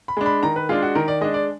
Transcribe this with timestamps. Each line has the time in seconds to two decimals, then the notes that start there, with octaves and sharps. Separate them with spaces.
0.08 B5
0.17 G#3 D4
0.26 B5
0.43 D#3 A#5
0.56 B4
0.69 G#3 D4 F4
0.82 F#4
0.95 D#3 A#4
1.08 D5
1.21 G#3 D4 D#5
1.34 D5